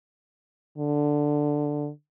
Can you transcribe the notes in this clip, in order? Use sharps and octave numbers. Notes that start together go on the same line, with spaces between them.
D3